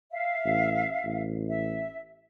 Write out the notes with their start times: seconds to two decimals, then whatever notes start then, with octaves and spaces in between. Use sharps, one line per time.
0.12 E5 F5
0.44 A1
1.04 A1
1.48 E5